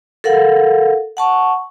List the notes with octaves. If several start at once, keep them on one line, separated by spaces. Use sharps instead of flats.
A4 A#4 F5 F#5
F#5 A5 C#6